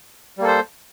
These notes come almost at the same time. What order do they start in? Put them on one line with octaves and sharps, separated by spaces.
G3 A#3 A4 C5